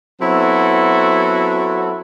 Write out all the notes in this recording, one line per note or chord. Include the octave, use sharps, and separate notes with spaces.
F#3 B3 C4 E4 F#4 A4